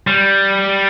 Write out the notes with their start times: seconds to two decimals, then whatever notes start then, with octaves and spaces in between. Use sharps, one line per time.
0.07 G3